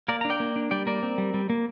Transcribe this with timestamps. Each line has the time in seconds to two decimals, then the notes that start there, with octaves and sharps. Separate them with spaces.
0.08 A#3 A#4 D5
0.21 D4 A#5
0.30 D5 G5
0.40 A#3
0.56 D4
0.71 G3 D5 G5
0.87 A#3 A#4 D5
1.03 C4
1.18 G3
1.34 G3
1.50 A#3